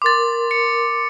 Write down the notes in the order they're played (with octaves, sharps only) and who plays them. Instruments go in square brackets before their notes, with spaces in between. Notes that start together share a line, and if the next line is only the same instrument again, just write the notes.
[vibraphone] A#4 C6 [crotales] D6 A6
[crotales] C#7